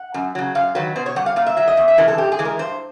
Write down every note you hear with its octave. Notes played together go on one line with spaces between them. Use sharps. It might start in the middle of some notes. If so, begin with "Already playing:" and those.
Already playing: F#5
F#2
C#3 F#3
F#2 F5
D#3 F#3 B4
B2 C5
C#5
G3 F#5
F5
A#2 F5
E5
F#3 E5
D#5
E2 E5
E5
C3 E3 G#3 A#4
A4
G#2 G4
G#4
E3 G#3
A#4
G2 C5